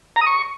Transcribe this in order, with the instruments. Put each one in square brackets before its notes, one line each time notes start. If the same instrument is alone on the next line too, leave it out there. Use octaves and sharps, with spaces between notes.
[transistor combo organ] A#5
D#6
C#6